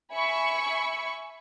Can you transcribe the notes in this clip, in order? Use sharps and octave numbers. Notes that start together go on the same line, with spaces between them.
E5 G#5 B5 C#6